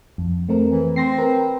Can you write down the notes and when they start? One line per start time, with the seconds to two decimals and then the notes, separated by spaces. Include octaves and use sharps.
0.18 F2
0.49 A3 C4 A#4
0.69 E3
0.96 C4 C6 A#6 C7
1.19 A#4 B4